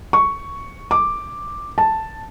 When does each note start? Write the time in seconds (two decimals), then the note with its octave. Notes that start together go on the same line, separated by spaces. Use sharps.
0.13 C#6
0.91 D6
1.78 A5